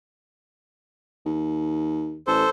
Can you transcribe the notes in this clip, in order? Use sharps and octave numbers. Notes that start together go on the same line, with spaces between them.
D#2
A1 A4 C5